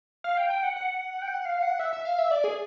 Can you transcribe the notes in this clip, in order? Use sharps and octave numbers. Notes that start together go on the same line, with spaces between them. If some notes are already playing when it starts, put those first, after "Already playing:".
F5
G5
G5
F#5
F#5
G5
F#5
F5
F#5
E5
E5
F5
E5
D5
G#4